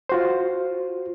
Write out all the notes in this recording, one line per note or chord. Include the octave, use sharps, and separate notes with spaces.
F4 F#4 C5